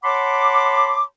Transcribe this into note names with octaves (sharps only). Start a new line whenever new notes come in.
C#5 F#5 A5 B5 C6 D6